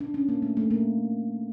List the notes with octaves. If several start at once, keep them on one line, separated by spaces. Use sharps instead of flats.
D4
C#4
A#3
A3
A3
A#3